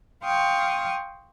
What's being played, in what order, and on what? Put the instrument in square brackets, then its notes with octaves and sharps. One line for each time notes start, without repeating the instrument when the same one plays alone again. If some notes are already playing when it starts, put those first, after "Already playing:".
[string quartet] F5 G5 C6 C#6 D#6